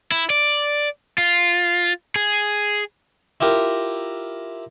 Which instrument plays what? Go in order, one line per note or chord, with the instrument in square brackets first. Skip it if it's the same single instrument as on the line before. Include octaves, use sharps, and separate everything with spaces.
[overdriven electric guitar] E4
D5
F4
G#4
[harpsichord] E4 F4 G4 A#4